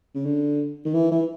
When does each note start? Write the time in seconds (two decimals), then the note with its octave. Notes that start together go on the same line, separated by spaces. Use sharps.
0.15 C#3
0.26 D3
0.85 D#3
0.94 E3
1.11 E3